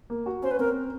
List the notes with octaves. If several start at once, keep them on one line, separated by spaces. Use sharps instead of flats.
A#3
F#4
C#4 C5
B4
C4 A#4